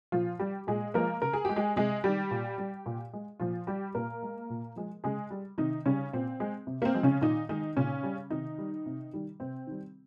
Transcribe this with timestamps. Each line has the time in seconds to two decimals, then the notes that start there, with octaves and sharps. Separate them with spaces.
0.12 A#2 F3 F4
0.39 G3 G4
0.67 A#2 G#3 G#4
0.94 F3 G#3 A#3 A#4
1.22 C#3 A#4
1.33 G#4
1.45 G#3 G4
1.56 G#3 G#4
1.76 C3 G#3 G#4
2.04 D#3 G3 G4
2.31 A#2
2.58 G3
2.86 A#2
3.13 G#3
3.40 A#2 F3 F4
3.67 G3 G4
3.95 A#2 A#3 A#4
4.23 G#3
4.50 A#2
4.76 F3 G#3
5.04 C#3 G#3 G#4
5.30 G3
5.58 C3 D#3 D#4
5.86 C#3 G3 C#4
6.13 A#2 C4
6.40 G#3
6.67 C3
6.82 A#3
6.85 C4
6.94 F3 G#3
7.03 C#3 C#4
7.21 A#2 D#3 D#4
7.49 D#3 G#3 D#4
7.76 A#2 C#3 C#4
8.03 G3
8.30 C3 D#3 D#4
8.58 G3
8.86 C3
9.13 D#3 G3
9.40 C3 C4
9.67 D#3 G3